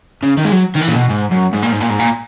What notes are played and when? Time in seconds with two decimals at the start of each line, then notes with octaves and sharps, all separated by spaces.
0.23 C#3
0.38 D#3
0.45 G#3
0.52 F#3
0.76 D#3
0.81 E3
0.89 A#2
0.96 B2
1.10 G#2
1.32 F#2
1.53 G#2
1.63 A#2
1.72 G#2
1.81 A#2
1.90 G#2
1.99 A#2